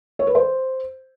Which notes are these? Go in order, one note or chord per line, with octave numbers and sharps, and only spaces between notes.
C#5
B4
C5